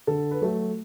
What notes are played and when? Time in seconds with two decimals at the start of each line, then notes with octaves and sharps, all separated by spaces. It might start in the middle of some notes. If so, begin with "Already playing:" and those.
0.07 D3 A4
0.31 B4
0.41 F#3 A3 A4